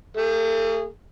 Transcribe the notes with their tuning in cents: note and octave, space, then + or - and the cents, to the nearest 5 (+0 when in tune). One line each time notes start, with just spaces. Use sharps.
A3 +45 G#4 -25